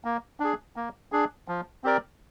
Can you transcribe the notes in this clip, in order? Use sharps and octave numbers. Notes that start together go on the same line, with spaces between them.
A#3
D4 G#4
A#3
D4 G#4
F3
C4 G4 A#4 D5